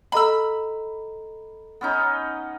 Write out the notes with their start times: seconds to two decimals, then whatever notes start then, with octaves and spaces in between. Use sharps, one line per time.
0.12 A4 D#5 A#5 B5 E6
1.81 B3 C#4 D#4